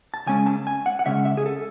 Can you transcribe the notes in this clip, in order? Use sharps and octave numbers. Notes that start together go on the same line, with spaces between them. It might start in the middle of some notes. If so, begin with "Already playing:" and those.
A5
C#3 G#3 C#4 G#5
A5
G#5
F#5
F#5
C#3 G#3 C#4 E5
E5
G#4
A4